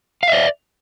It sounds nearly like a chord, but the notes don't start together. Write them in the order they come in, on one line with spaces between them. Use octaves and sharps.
F5 E5 D5